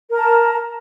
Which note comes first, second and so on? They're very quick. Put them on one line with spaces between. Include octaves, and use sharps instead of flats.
A#4 A#5 A5